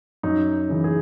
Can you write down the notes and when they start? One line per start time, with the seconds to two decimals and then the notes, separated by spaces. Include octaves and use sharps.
0.23 F#2 D#4
0.69 C#3 E3
0.84 G#4